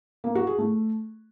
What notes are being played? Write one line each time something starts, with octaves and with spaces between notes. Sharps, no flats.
A#3
F#4
G#4
A3